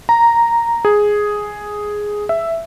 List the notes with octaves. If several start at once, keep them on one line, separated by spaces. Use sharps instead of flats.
A#5
G#4
E5